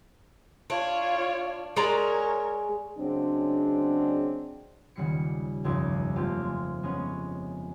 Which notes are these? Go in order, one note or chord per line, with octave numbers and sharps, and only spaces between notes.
D4 F4 C#5
G#3 A#4 C#5 D5 A#5
C#3 F#3 G#3 C4 D4
D#1 C#3 G3 C7 C#7
F1 C#2 G2
A3 A#3 C4 F4 G4
G#3
G#3 B3 C#4